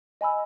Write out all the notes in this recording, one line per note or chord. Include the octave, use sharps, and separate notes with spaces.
D#5 G#5 B5 E6